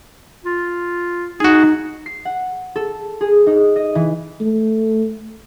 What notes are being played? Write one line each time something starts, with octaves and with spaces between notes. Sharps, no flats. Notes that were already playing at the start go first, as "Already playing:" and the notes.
F4
D#4 F#4 G#4
C7
F#5
A4
G#4
D#4
D#5
E3
A3